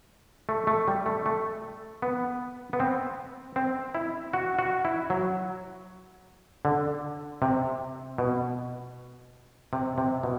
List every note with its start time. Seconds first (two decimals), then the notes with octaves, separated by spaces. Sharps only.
0.49 A3
0.67 A3
0.88 G3
1.06 A3
1.26 A3
2.02 B3
2.73 B3
2.80 C4
3.56 C4
3.95 E4
4.33 F#4
4.59 F#4
4.85 E4
5.10 F#3
6.65 D3
7.42 C3
8.18 B2
9.73 C3
9.98 C3
10.23 B2